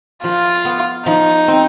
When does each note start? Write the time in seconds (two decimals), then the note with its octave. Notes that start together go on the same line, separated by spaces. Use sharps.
0.24 F3 F4
0.65 B3
1.06 F3 D#4
1.48 C4